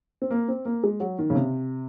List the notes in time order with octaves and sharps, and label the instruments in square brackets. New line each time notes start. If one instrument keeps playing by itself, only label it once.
[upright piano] C4
A#3
C4
A#3
G#3
F#3
D#3
C#3
C3